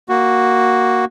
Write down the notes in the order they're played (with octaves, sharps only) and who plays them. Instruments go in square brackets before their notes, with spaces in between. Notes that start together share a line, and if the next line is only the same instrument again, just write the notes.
[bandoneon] A#3 F#4